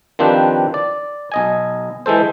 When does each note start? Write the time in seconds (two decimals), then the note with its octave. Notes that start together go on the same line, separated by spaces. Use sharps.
0.19 D#3 F3 C4 D4 G4 B4
0.74 D5
1.32 B1 D#5 G#5
2.06 E3 G#3 A4 C5